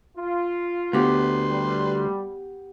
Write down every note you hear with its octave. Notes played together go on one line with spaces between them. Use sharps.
F4
D2 B3 G4 B4 C6
G3